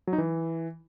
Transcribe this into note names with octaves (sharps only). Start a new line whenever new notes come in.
F#3
D#4
E3